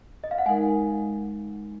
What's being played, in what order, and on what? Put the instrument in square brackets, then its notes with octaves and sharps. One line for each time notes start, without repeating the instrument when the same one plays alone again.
[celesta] D#5
F5
F#5
[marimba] G#3 D#4 A#4 [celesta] G#5